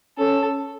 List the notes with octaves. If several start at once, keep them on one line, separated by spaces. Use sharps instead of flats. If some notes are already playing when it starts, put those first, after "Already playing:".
C#4 A4